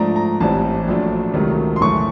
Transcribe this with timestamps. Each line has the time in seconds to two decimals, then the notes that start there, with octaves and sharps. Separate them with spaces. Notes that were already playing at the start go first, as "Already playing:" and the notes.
Already playing: G#2 F3 A3 D4 A#5
0.16 A#5
0.40 A1 A2 E3 G3 C4 A5
0.87 A#1 A#2 F#3 A3 D4
1.34 C#2 C3 D#3 F#3 A3
1.76 C6
1.81 F#2 C#3 E3 A3 C#6